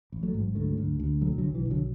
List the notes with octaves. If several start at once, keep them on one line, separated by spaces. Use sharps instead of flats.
A1
F#3 A3
G#2
D2 F#3 A3
D2
D2
B1 F#3 A3
D3 F#3
B1
E3
B1
D3 F#3